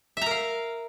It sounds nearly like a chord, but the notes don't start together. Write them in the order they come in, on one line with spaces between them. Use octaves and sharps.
E5 A#5 A#4 F5